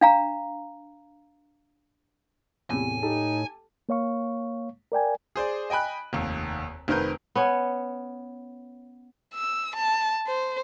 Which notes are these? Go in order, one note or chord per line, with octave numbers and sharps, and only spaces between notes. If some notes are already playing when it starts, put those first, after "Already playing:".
D4 F5 A#5
E2 A2 C3 G#5
D#4 G4 A4 A5
A#3 C#5 F5 C#6
A#4 D5 G5 G#5
G#4 C5 D5
D#5 G5 G#5 B5 F#6
F1 D#2
F1 D#3 C4 A#4 B4 G6
B3 C#4 C#5
E6
A5
C5